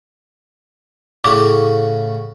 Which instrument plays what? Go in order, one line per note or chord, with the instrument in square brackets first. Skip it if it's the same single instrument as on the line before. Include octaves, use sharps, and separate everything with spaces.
[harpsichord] A2 C#3 F#4 [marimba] D6